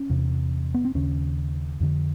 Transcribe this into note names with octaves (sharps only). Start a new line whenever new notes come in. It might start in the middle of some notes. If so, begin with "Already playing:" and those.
Already playing: C#4
E2 C3
B3
C4
D#2 C#3 C#4
F2 D3